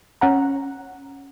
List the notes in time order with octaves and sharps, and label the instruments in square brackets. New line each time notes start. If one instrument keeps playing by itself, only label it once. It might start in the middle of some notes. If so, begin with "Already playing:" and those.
[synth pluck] C#4 F#5 A#5